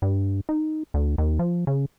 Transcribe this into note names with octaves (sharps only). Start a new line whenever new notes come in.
G2
D#4
D2
D#2
F3
C#3